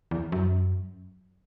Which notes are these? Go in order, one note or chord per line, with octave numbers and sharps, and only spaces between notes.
E2
F#2